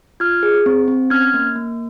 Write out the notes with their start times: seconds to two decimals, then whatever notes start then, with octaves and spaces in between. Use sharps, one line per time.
0.20 F4 F6 G#6
0.43 G#4
0.66 C4
0.88 C4
1.10 C#4 F6 G#6
1.34 A#3
1.56 A#3